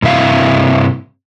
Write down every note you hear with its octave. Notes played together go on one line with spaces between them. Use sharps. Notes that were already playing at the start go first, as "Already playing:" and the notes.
G2 C3 E4 F5